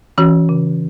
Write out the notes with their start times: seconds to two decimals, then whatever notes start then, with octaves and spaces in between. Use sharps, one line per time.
0.18 E3 C#4 F#4
0.49 C#3